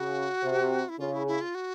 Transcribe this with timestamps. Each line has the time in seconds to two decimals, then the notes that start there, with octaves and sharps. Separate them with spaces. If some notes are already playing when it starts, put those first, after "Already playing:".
Already playing: C#3 F#4
0.44 C3
0.89 E4
0.99 C#3 F4
1.13 E4
1.27 E4
1.41 F4
1.55 F#4